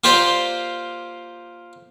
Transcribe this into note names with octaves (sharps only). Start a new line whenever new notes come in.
A#3 F4 G4 C5 D5